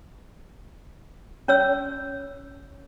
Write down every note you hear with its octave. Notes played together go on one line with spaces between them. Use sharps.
C#4 C#5 E6